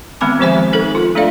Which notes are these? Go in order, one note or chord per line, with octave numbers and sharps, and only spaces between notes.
D#3 G#3 B3 C4 B5 D6
D#3 F3 G4 C5 E5 G#5
D#4 A4 A#4
F4
A3 D4 A4 D5 F5